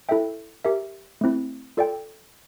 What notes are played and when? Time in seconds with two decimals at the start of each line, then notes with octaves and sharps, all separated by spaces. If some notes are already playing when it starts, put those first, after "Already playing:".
0.09 E4 A4 E5 G5
0.65 G4 A#4 E5
1.21 A3 C4 E4
1.77 F4 A4 D5 G5